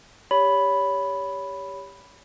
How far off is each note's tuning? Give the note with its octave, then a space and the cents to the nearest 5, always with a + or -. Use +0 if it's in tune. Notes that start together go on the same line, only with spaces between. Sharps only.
G4 +15 C#5 +25 B5 +0